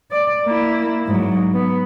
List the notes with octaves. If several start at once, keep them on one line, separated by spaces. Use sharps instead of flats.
D5
A#3 E4
G#2 F#3
B3